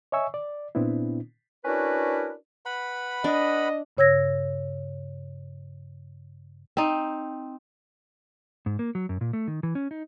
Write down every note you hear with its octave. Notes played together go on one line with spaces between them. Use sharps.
C#5 D#5 E5 G#5 C#6 E6
D5
A#2 B3 C4 D4 E4
C#4 D4 E4 F#4 A#4 B4
B4 F#5 B5
D4 D#5
G2 C#3 C#5 E6 G#6 A#6
C4 D#4
G#2
A#3
F#3
F#2
A#2
A3
D#3
E3
C#4
D#4